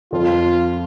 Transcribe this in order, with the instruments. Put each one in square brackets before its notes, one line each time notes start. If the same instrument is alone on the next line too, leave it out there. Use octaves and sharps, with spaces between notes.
[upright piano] F2 F3 C4 [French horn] F4